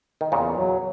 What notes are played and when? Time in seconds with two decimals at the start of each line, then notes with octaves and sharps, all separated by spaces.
0.21 D#3
0.32 E2 A#2 C#3
0.56 F#3